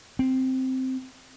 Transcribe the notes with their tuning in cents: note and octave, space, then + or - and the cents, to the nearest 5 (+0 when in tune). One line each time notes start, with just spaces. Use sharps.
C4 -5